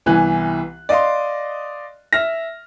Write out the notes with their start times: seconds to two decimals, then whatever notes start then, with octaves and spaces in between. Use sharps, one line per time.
0.06 C2 E3 B3 G#5 F#6
0.89 D5 D#5 F5 C6
2.13 E5 F6 A#6